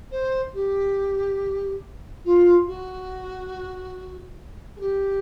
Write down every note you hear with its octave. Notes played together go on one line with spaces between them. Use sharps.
C5
G4
F4
F#4
G#4
G4